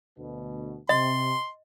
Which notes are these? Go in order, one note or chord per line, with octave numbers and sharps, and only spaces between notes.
D2 B2
C3 D#5 C6